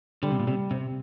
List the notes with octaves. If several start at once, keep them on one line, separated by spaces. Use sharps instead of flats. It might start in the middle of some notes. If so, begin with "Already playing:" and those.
D3 G3
C3
A#2
C3 G3
C3 C4